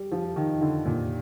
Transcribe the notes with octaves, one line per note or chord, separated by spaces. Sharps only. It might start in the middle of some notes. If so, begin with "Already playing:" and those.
Already playing: G3
F3
D#3
D3
A#2